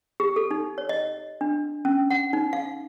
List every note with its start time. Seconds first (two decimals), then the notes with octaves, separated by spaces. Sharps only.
0.20 G4
0.36 A4
0.51 D#4
0.78 C#5
0.89 D#5
1.41 D4
1.85 C#4
2.10 F#5
2.33 D#4
2.53 F5